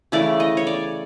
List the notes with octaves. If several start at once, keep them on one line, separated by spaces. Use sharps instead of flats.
C#3 E3 A3 D5
D#5
C#5
D5